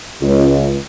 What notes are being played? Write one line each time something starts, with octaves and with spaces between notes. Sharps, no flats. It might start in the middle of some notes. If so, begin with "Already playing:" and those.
C#2